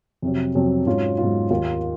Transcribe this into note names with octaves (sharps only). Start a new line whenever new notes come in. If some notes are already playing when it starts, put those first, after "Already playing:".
F2 C3 F#3
F2 C3 F#3
G#2 F#3 C#4 F4
G#2 F#3 C#4 F4
D#2 D#3 A#3 F4